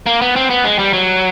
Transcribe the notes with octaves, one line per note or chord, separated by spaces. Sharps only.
A#3
B3
C4
B3
G#3
G3
F#3